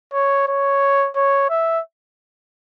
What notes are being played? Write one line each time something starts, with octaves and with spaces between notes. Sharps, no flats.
C#5
C#5
C#5
E5